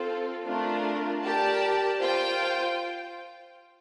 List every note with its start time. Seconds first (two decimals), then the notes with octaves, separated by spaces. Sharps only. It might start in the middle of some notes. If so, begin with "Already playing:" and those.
Already playing: C4 F4 A4
0.46 A3 D4 F4 A#4
1.24 G4 A#4 D5 A5
2.00 F4 C5 G5